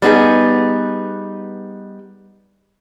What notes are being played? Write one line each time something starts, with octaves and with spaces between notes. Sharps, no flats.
G3 B3 D#4 G#4